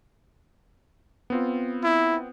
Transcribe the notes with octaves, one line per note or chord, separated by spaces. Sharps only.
B3 C4 F4
E4